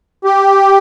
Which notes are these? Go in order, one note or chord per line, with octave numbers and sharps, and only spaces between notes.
G4